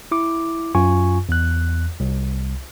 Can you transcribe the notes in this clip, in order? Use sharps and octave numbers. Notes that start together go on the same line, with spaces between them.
E4 D6
F#2 F4 G#5 C#6
E2 F#6
C2